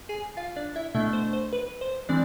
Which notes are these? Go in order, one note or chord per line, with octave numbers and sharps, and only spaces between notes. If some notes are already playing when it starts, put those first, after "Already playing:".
G#4 G#5
F4 F5
D4 D5
E4 E5
B2 A3 D4 E4 E5
C5
C5
B4
C5
E3 G#3 C4 D4 D5